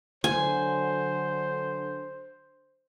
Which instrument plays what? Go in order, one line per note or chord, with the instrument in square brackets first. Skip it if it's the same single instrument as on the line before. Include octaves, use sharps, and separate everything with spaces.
[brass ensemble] D3 F#3 [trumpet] C5 [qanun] G#5